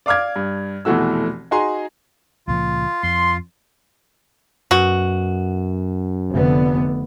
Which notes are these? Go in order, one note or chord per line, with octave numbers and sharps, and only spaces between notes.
D5 F5 D6 F6 G#6
G2
F1 B2 E3 A3 F#4 E6
D#4 F#4 G#4 G#5 A#5 C6
C#2 A#2 F3 F4
F2 C6
F#2 B2 F#4
F1 D3 B3